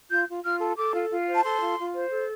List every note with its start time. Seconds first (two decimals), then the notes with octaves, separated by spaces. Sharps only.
0.11 F4 G6
0.28 F4
0.44 F4 F6
0.60 A4
0.77 A4 D6
0.94 F4
1.10 F4
1.27 C5
1.34 A5
1.44 A4 C6
1.61 F4
1.78 F4
1.94 C5
2.11 A4